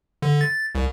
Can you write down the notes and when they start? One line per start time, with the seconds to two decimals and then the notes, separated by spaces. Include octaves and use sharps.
0.22 D3
0.41 A6
0.75 C2